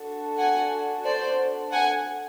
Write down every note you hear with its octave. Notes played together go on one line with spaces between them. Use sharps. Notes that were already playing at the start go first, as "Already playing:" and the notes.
Already playing: D4 F#4 A4
F#5 G#5
C5 D5
F#5 G#5